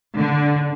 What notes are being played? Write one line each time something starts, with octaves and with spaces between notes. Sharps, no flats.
D3